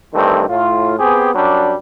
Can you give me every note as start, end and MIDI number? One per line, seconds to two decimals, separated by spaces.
0.14 0.45 43
0.14 0.45 51
0.14 0.45 52
0.14 0.45 57
0.14 0.45 60
0.49 0.96 45
0.49 0.96 65
0.99 1.34 59
0.99 1.34 60
0.99 1.34 67
0.99 1.34 68
1.35 1.75 42
1.35 1.75 54
1.35 1.75 55
1.35 1.75 62